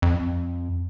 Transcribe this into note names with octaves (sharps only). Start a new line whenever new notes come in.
F2